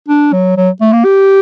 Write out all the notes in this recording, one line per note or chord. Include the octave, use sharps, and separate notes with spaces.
D4
F#3
F#3
A3
A#3
G4